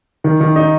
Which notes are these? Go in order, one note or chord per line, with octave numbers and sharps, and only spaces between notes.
D#3
D#3
D#4